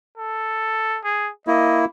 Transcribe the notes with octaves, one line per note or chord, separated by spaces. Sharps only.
A4
G#4
A#3 E4 D#5